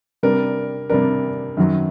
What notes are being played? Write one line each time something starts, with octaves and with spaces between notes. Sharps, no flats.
C3 G3 D4 A#4
C3 G3 D4 A#4
F#2 D#3 F#3